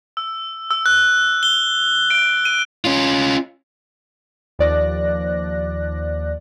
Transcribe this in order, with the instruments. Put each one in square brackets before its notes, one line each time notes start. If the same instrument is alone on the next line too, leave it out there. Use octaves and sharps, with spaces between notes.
[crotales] E6
E6
F#6
G7
D7
D#7
[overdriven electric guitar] C#4 F4
[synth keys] D#2 F3 D5 F#6 A#6